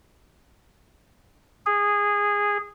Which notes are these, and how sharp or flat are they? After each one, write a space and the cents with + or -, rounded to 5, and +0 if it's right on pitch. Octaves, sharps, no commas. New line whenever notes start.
G#4 -15